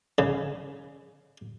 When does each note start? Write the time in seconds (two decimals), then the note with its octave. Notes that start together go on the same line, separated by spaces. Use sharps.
0.18 C#3